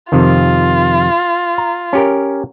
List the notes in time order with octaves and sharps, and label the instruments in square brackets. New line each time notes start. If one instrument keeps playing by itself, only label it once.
[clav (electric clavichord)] F2 C3 D#3 [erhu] F4
[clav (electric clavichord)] A#5
C#4 G4 A#4